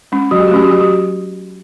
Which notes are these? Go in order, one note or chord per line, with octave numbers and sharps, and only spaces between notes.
G#3 C#4
F#3 F#4
G4
F#4
A3 C#4 G4
F#4
F#3 G4
F#4